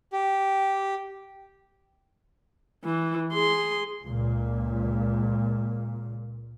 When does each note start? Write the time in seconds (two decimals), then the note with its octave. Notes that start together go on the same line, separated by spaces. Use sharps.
0.13 G4
2.84 E3
3.33 G#4 C6
4.04 C#2 A#2